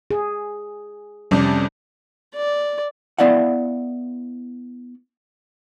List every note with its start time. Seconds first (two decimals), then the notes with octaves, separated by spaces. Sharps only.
0.11 G#4
1.31 F2 C3 G3 C#4 D5
2.35 D5
3.19 B3 E4 D5 F5 F#5